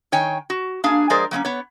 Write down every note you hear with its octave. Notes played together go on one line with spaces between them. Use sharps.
D#3 C#5 G5 G#5
F#4
A#3 D4 G#4 F5 G#5
F3 G#3 G#4 A#4 C5 D5
F#3 A#3 B3 C#4
B3 C#5